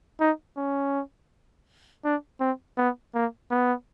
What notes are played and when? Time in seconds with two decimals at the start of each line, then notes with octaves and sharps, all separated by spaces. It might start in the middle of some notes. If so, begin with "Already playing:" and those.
0.20 D#4
0.56 C#4
2.04 D4
2.40 C4
2.77 B3
3.14 A#3
3.51 B3